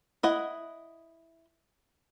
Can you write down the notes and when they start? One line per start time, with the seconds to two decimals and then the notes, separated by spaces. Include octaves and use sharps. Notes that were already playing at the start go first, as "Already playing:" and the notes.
0.23 E4 D#5 F#5